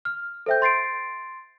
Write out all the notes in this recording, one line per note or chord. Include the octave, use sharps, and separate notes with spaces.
F6
A4 C5 E5 G5 G6
C6 A6 C7 D7